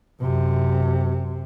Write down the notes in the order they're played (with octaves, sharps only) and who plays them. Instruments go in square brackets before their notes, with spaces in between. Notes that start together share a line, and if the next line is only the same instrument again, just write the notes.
[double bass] F#2 C3